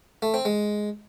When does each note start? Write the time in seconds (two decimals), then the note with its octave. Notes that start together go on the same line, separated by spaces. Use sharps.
0.22 A3
0.34 C4
0.45 G#3